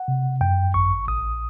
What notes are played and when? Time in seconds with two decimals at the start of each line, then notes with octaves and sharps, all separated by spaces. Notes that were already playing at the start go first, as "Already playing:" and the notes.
Already playing: F#5
0.08 C3
0.41 F#2 G5
0.74 G#1 C#6
1.08 A#1 D#6